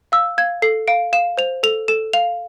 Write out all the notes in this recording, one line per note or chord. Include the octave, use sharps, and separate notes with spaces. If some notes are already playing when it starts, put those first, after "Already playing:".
F5 E6
F5 G#6
A4 C7
F5 D7
F5 E7
C5 F7
A4 F7
A4 E7
F5 F7